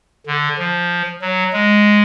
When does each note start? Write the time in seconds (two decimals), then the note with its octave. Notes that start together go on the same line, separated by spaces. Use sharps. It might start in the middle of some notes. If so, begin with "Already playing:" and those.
0.27 D3
0.58 F3
1.21 F#3
1.53 G#3